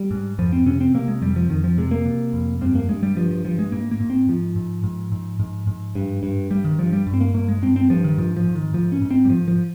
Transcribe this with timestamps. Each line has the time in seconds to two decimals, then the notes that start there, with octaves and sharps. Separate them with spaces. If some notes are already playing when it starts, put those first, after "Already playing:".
Already playing: G3
0.11 G#2
0.38 F2 F3
0.52 C4
0.66 C3 C#4
0.81 C4
0.94 C3 A#3
1.08 G#3
1.22 F2 G3
1.36 F3
1.50 F2 D#3
1.64 F3
1.77 C3 G#3
1.91 A#3
2.05 C3
2.33 F2
2.61 G2 C4
2.75 A#3
2.89 G2 G#3
3.03 G3
3.17 G2 F3
3.31 F3
3.45 G2 F3
3.59 G#3
3.72 G#2 A#3
3.91 A#3
4.00 G#2
4.10 C4
4.28 G#2 F3
4.56 G#2
4.84 G#2
5.12 G#2
5.39 G#2
5.67 G#2
5.95 G2
6.23 G2
6.51 G2 G3
6.65 D#3
6.79 G2 F3
6.93 G3
7.07 G2
7.14 C4
7.20 A#3
7.34 G2 A#3
7.48 G#3
7.62 G2 C4
7.76 C4
7.90 G2 F3
8.04 D#3
8.18 G#2 F3
8.37 F3
8.45 G#2
8.55 D#3
8.73 G#2 F3
8.92 C#4
9.02 G#2
9.11 C4
9.25 G3
9.29 G#2 F3
9.48 F3